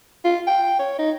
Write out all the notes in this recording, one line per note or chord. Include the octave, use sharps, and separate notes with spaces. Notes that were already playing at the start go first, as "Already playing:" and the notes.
F4
G5
C#5
D#4